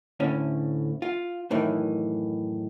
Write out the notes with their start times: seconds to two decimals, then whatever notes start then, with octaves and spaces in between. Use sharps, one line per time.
0.20 D2 A2 D3 C#4
1.02 F4
1.51 F#2 A2 D#3 E3